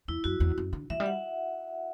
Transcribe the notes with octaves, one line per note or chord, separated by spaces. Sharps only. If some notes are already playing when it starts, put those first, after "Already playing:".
E2 E4
F#2 F#4
E2
F#2
D3
E3 E5
G3
F#5